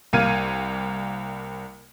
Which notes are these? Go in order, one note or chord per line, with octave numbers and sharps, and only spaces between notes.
C2 A#3 F6 G#6 D#7